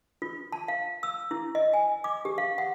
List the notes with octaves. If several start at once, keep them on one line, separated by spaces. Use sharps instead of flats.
F4
A5
F5
E6
E4
D#5
G#5
D6
G4
F5
F#5